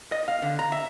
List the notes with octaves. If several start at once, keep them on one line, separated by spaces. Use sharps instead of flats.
D#5
F5
D3
A#5
E5